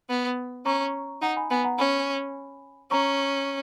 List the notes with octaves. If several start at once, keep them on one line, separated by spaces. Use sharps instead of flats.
B3
C#4 A#5 C#6
D#4 F#5 A#5
G#5 B5
B3 G#5 B5
F#5 A#5
C#4 G#5 B5
C#4 A#5 C#6